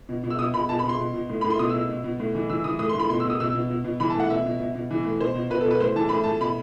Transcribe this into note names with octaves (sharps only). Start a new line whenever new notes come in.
B2
B2
E6
B2 D#6
B2 B5
B2 A5
B5
B2 C6
B2
B2
A2
A2 B5
C6
B2 D#6
E6
B2
B2
B2
A2
E3
E3 E6
E3 D#6
A2 D#6
C6
A2 B5
B2 C6
E6
B2 D#6
B2 E6
B2
B2
B2
E3 B5
A5
A2 F#5
B2 E5
B2
B2
B2
E3
A2
B2 C5
B2
B2 B4
A4
B2
B4
A2 C5
E3 A5
A2 B5
A2 A5
B2 B5